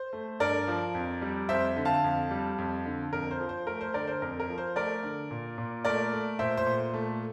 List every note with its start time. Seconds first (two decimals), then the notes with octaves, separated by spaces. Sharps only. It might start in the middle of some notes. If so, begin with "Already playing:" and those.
Already playing: C5
0.13 A3
0.40 G2 A#4 D5
0.67 F3
0.95 F2
1.22 G3
1.49 F2 C5 E5
1.76 D3
1.85 F5 A5
2.04 F2
2.31 G3
2.58 F2
2.86 D3
3.13 F2 A#4
3.31 C5
3.40 F3
3.49 C5
3.67 A3 A#4
3.81 C5
3.94 D3 A#4 D5
4.07 C5
4.22 F2 A#4
4.40 A#4
4.49 F3
4.58 C5
4.76 A3 A#4 D5
5.03 D3
5.31 A#2
5.58 A#2
5.85 A3 A#4 D5
6.13 A3
6.39 A#2 C5 E5
6.57 C5
6.66 A#2
6.94 A3